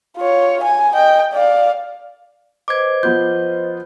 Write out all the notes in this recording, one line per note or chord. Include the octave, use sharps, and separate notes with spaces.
F4 C#5
G#5
D#5 G5
D5 F5
B4 C5 D#5 D6 G#6
F3 B3 F4 G6